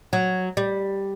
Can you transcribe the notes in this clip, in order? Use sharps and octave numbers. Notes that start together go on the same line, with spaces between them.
F#3
G3